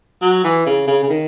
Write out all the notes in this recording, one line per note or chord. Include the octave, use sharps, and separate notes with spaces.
F#3
E3
C#3
C#3
C#3
D#3